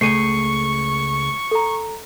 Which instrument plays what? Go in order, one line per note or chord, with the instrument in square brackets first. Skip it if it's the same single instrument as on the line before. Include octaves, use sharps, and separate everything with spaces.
[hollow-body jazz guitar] C#2 A3 [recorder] C#6 [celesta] C7 D#7
[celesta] A4 A#5